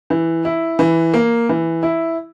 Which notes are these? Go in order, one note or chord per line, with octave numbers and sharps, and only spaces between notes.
E3
E4
E3
A#3
E3
E4